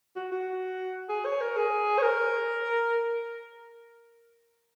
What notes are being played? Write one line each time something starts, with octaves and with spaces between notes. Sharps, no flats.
F#4
F#4
G#4
C#5
A#4
G#4
C#5
A#4